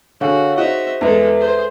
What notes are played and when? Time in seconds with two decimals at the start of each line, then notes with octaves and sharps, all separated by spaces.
0.21 D3 F#4 G#4 C#5 F5 F#5
0.58 D#4 F#4 G#4 C5 D#5 E5
1.01 E2 G#3 A4 B4 E5
1.38 G#4 C5